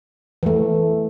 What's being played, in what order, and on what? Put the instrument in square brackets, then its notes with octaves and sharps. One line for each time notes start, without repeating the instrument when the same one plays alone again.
[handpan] E3 A3